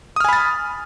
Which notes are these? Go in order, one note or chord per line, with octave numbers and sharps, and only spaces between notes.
G#5 B5 D#6 F6 A6